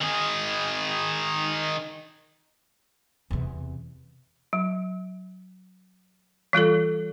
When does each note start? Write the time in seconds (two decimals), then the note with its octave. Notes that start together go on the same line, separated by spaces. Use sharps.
0.01 D#3 G#4
3.31 E2 C3
4.53 F#3
6.53 E3 G3 F4 A4